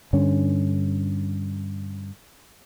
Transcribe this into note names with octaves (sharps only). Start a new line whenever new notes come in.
G2 D3 C#4